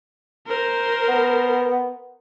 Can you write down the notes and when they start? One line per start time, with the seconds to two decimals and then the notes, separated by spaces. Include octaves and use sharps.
0.47 A#4 C5
1.08 B3